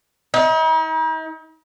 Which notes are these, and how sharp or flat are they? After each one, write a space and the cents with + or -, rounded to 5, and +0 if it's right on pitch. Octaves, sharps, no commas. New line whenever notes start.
D#4 +45